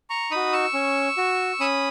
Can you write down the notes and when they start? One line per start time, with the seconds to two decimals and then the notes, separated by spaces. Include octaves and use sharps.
0.10 A#5 C#6
0.31 D#4 F#4 B5 D#6
0.53 C#6 E6
0.74 C#4
1.17 F#4
1.60 C#4 B5 D#6